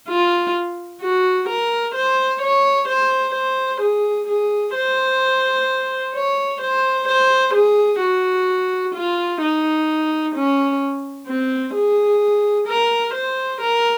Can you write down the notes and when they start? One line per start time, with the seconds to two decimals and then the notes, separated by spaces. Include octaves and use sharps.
0.09 F4
1.01 F#4
1.48 A#4
1.95 C5
2.42 C#5
2.88 C5
3.34 C5
3.81 G#4
4.28 G#4
4.75 C5
6.15 C#5
6.61 C5
7.08 C5
7.54 G#4
8.01 F#4
8.95 F4
9.42 D#4
10.35 C#4
11.27 C4
11.75 G#4
12.67 A#4
13.14 C5
13.61 A#4